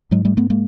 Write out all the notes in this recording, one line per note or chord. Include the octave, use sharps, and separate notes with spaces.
G#2 F#3 G#3
G3 A3
A3 B3
G#3 A#3